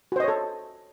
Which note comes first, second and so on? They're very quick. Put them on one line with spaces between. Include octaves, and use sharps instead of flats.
F#4 C5 D#5 C#5 A4